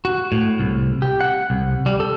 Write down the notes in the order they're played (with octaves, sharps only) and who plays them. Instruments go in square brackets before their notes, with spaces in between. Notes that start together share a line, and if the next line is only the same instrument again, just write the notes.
[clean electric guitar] F#4
A2
C2
G4
F#5
C2
G3
A4